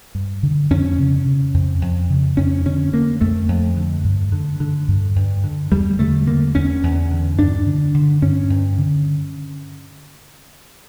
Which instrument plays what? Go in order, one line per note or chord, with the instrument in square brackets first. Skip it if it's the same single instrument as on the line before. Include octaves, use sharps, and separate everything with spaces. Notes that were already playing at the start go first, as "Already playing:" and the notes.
[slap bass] G2
D3
F2 C#4
C#3
C#3
F2
F2
C#3
F2 C#4
D3 C#4
D3 A#3
F2 A3
F2
D3
G2
D3
D3
G2
G2
D3
E2 G3
D3 A3
D3 A#3
E2 C#4
E2
D3
G2 D4
D3
D3
G2 C#4
G2
D3